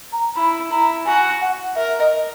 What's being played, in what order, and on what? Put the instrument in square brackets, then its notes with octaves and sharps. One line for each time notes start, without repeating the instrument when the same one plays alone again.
[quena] A#5
[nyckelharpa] E4 [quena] B5
[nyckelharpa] E4 [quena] A#5
[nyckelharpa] F#4 [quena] G#5
[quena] F#5
[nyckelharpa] A#4 [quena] E5
[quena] D#5